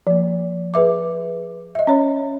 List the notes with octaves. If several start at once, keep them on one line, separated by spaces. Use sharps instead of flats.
F3 A#3
G#4 B4 E5 D6
D#5 E5
C#4 C#5 B5